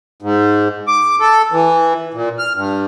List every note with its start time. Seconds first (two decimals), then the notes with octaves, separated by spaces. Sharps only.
0.22 G#2
0.88 D6
1.20 A4
1.52 E3
2.14 A#2
2.39 F6
2.56 G2